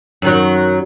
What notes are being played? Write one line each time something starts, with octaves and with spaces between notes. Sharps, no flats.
F#2 D#3 F#3